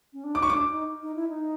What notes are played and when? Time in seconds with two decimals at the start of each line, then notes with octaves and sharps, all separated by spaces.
0.13 C#4
0.24 D4
0.34 D#4 D6
0.42 C#6
0.50 D4 D6
0.71 D#4
1.02 D#4
1.16 E4
1.29 D#4